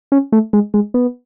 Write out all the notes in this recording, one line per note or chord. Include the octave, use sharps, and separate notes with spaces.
C#4
A3
G#3
G#3
B3